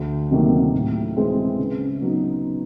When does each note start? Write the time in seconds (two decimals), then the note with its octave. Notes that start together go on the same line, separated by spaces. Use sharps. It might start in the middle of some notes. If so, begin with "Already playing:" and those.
Already playing: D2
0.31 C3 D#3 F#3 A#3
0.73 A2
1.16 E3 G#3 C4
1.58 C#3
2.01 F#3 B3 D#4